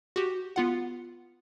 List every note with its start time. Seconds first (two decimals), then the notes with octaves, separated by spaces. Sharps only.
0.16 F#4 G4
0.56 B3 F4 F#5